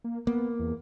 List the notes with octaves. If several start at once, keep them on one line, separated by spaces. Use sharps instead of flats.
A#3
A#3 B3
E2